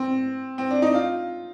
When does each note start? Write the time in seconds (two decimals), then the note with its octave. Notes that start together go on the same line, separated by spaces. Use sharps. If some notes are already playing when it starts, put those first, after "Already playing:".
Already playing: C4
0.58 C4
0.71 D4
0.82 D#4
0.94 F4